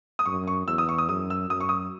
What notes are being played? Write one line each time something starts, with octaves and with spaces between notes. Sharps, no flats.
D#6
F#2 C#6
C#6
E2 E6
D#6
C#6
D#6
F#2 D#6
E6
F#2 D#6
C#6
D#6